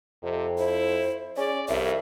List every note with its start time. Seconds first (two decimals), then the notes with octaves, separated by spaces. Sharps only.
0.23 F2 C3
0.58 E4 C5
1.37 C#4 G#4 D5
1.69 C2 F2 E5